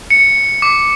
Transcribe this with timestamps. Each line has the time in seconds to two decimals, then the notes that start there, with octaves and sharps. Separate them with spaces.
0.10 C#7
0.62 D6